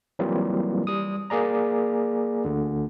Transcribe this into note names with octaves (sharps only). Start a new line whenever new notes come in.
E3 F#3 G3 A#3 C4 F4
G3 D#6
A#3 G#4 D5 A#5
D2 D3